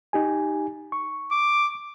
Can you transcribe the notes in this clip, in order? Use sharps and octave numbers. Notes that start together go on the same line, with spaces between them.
D#4 G4 G#5
C#6
D6